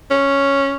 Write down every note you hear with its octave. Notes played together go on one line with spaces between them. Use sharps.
C#4